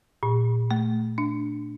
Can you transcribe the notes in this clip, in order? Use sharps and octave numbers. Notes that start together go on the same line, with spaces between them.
A#2
A3
D4